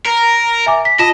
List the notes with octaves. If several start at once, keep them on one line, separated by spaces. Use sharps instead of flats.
A#4
E5 G#5 D6
B6
F4 D#5 A5 E7